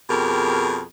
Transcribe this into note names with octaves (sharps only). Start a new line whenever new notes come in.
F2 B2 G4 G#4 A#4